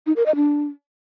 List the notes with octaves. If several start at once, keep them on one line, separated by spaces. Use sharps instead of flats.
D#4
A#4
D#5
D4